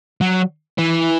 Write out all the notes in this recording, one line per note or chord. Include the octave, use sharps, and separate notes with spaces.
F#3
E3